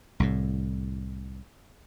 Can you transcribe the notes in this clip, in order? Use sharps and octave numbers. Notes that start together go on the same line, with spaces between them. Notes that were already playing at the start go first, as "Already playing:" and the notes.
C2 A2